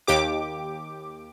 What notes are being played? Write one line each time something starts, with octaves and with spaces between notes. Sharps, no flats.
D#2 G4 D6